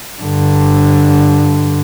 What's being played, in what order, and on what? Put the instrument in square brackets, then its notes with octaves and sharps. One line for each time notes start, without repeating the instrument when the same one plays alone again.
[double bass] G2 D3